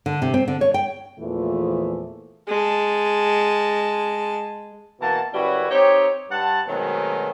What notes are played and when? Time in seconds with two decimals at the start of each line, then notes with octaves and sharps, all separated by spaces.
0.06 D3
0.22 C3
0.34 C4
0.48 D3
0.61 C#5
0.74 G5
1.19 E2 A#2 E3 F3 A3
2.48 G#3 A5
5.00 B2 E3 A#3 F#4 A5
5.33 F#2 C#3 G3 E4 F#4 B4
5.70 C4 D#4 G4 C#5
6.30 G2 F#5 A5
6.67 B2 D#3 F#3 G#3 A3 C4